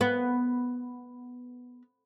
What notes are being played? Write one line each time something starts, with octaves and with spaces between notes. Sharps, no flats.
B3